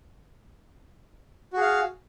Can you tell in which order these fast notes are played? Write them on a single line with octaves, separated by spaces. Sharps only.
F#4 G#4 F5